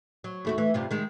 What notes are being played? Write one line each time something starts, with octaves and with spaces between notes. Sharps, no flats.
F#3
D#2 A3 F#4
E3
G2 C3 F4
D#3 G#3